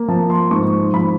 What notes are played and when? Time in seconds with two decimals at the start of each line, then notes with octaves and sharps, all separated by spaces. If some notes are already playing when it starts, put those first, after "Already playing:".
Already playing: A#3
0.08 F3 A5
0.30 C6
0.51 G#2 C#6
0.94 F3 B5